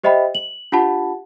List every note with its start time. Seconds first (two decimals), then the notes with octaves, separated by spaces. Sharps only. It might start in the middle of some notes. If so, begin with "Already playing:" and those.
0.03 G4 C5 D#5 E5 G5 B5
0.35 F#7
0.72 D4 F4 G4 F#5 A5 B5